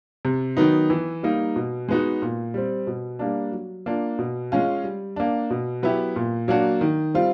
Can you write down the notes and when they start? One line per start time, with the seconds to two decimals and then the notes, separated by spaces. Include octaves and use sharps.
0.25 C3
0.57 D#3 F#3 B3 D#4
0.90 E3
1.23 G3 A#3 D#4
1.56 B2
1.89 G#3 B3 D#4 F#4
2.22 A#2
2.54 G3 C4
2.87 B2
3.19 G3 A#3 D4
3.52 F#3
3.86 A#3 D4 F4
4.19 B2
4.52 G#3 C#4 F4
4.84 G3
5.16 A#3 D4
5.50 B2
5.83 F#3 B3 E4 G4
6.16 A#2
6.48 F#3 A#3 D4 F#4
6.81 D#3
7.14 G3 C4 F4